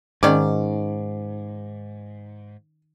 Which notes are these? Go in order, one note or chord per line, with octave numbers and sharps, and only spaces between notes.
G#2 D#3 C#4 D5